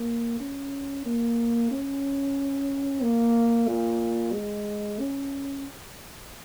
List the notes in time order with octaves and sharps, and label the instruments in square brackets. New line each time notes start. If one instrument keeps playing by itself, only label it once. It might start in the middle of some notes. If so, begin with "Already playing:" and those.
Already playing: [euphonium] A#3
C#4
A#3
C#4
A#3
A#2
G#3
C#4